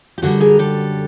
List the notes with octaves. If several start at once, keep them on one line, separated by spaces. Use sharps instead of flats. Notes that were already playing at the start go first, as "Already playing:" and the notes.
G4
F#2 D3 G3 F#4 G#4
G#4 A#4
G4 A4